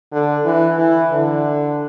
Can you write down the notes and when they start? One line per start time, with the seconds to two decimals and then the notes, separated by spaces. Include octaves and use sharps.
0.12 D3
0.45 E3
0.78 E3
1.11 D3